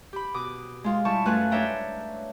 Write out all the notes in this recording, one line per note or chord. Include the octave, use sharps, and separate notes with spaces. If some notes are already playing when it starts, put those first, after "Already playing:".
G4 B5
B2 D6 D#6
G#3 F4
G3 E4 A5 C#6
F#2 A3 F4 B4 G#5 F#6
D4 B4 C#5 E5 G5 A#5